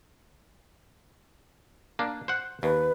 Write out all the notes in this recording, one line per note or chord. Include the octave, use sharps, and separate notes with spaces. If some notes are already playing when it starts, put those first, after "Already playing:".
A#3 D4
C5 F#5
D#2 B4